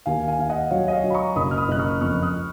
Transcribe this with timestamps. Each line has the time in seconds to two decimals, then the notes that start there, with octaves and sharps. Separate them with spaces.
0.06 D#2 F5 G#5
0.28 F5 G#5
0.39 D#2 F5
0.49 D#5 F#5
0.71 F#3 C#5 F5
0.88 D#5
0.93 C#5 F5
1.04 F#3
1.10 B5
1.14 A#5 C#6
1.36 F#1 B5 D#6
1.51 F6
1.57 B5 D#6
1.68 F#1 F#6
1.79 C#6 F6
2.01 F2 C#6 F6
2.22 D#6 F#6